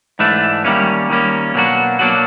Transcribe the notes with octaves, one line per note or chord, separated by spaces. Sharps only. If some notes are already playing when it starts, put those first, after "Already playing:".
G#2 E3 A3 D4
D#3 G3 A#3 C#4
D#3 G3 A#3 C#4
B2 F#3 A#3 D4 F#4
B2 F#3 A#3 D4 F#4